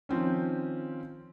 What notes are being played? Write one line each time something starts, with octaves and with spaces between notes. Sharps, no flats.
D#3 F3 C4 C#4